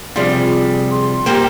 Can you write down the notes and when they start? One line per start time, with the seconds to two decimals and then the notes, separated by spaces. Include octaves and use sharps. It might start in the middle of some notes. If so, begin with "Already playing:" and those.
0.16 C3 F3 G3 D4 F4 G#4
0.91 C6
1.26 G3 A#3 G4 C5 G6